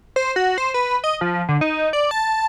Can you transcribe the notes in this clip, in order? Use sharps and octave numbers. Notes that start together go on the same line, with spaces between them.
C5
F#4
C5
B4
D#5
F3
D3
D#4
D5
A5